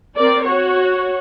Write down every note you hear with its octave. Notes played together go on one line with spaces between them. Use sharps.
C4 A#4 D5
F#4 C#5